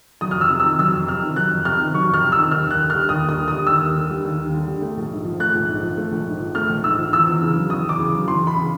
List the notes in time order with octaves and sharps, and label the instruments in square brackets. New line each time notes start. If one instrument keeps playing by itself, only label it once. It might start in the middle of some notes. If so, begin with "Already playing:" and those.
[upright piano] F#3 D#6
F2 F6
E6
C3
D#3 E6
F#3 E6
F2
C3 F6
D#3
F#3 F#6
F2
C3 F6
D#3
F#3 C#6
F2 F6
C3
D#3 E6
D#2 F6
D#2 F#6
D3
G3 F6
D#2 D#6
D#2 D#6
D3
G3 D#6
D#2 E6
D#2
D3
G3
D#2
D#2
D3
G3
A3
A#1
G#2
F3
A3 F#6
A#1
G#2
F3
A3
A#1
G#2
F3
A3 F6
A#1
G#2 E6
F3
E2 E6
E2
C#3
F#3
E2 D#6
E2 D6
C#3
F#3
E2 C6
E2 B5
C#3